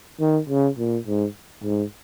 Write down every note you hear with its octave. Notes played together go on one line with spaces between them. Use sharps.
D#3
C#3
A#2
G#2
G#2